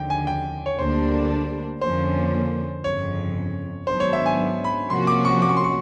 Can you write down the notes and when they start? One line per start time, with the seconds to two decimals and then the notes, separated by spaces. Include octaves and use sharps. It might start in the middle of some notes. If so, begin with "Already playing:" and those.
Already playing: D#2 D3 F3 G5
0.10 G#5
0.27 G5
0.66 C#5
0.79 D2 D3 G3 A#3 D4 C5
1.81 F2 D3 F3 A#3 C#4 C5
2.84 G1 F2 C#3 C#5
3.87 G#2 D#3 F#3 B3 D4 C5
4.00 C#5
4.13 E5
4.26 G#5
4.64 B5
4.90 C3 F3 A#3 C#4 F#4 C6
5.07 D6
5.25 C#6
5.42 D6
5.49 C#6
5.57 C6
5.64 C#6